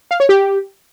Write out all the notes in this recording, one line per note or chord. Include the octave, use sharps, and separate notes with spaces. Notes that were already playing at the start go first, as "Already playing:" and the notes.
F5
C#5
G4